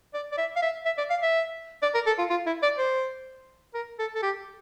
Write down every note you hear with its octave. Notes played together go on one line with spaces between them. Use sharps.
D5
D5
E5
F5
E5
E5
D5
F5
E5
D5
A#4
A4
F4
F4
E4
D5
C5
A#4
A4
A4
G4